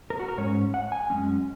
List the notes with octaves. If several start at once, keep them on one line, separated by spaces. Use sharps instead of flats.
A#4
F#4
A#4
G#2 G#3 C#4 C#5
F#5
G#5
F#2 C#3 G#3 C#4